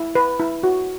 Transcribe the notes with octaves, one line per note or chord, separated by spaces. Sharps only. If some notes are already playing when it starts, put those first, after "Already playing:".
Already playing: E4
B4
E4
F#4